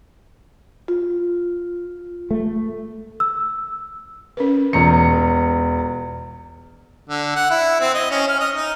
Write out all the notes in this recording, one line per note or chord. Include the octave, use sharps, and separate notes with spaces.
F4
A3
E6
C#4 A#4 B4
E1 E3 F4 A#5 C#7
D3
F#5
E4
C4
D#5
C#4
F6
D#5
D#4